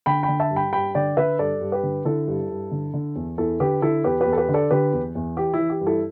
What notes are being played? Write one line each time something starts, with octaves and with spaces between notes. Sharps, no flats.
D3 G5 B5
G5 B5
D3
E5 A5
G2
G5 B5
G2 G5 B5
D3 D5 G5
D3 B4 E5
G2 A4 D5
G2
G4 B4
D3
D3 E4 A4
G2
G2
D3
D3
E2
E2 E4 A4
D3 G4 B4
D3 E4 A4
E2 G4 B4
G4 B4
E2
A4
G4 B4
D3
A4 D5
D3 G4 B4
E2
E2
E3 G4
E4
E3
G4
G2
E4 A4